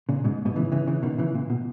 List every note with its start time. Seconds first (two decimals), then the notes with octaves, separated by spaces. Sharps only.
0.09 A#2 C#3
0.24 G#2 B2
0.45 G#2 B2
0.56 C#3 E3
0.72 C#3 E3
0.87 C#3 E3
1.03 B2 D#3
1.18 C#3 E3
1.35 A#2
1.50 B2